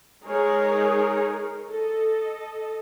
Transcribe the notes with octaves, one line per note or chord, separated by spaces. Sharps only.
G#3 D#4 G#4 A#4 C#5
A4 D#5